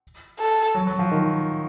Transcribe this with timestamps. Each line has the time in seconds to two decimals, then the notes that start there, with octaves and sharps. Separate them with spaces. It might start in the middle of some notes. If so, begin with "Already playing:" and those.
0.39 A4
0.75 F#3
0.87 F#3
0.99 F3
1.11 D#3